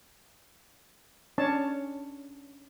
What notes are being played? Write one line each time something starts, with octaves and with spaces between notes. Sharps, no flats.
C#4 D4 C#5 A5